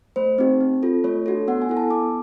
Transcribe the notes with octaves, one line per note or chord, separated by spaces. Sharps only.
A3 C5
C4 D#4 G4
C4
F4 A4
A3 C#5
D4 F#4 A4
B3 F#5
G#5
E4 A4
A5
B3 D6